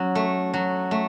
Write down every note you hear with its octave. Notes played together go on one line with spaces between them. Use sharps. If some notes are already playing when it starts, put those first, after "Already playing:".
Already playing: F#3 C#4
A3
F#3
A3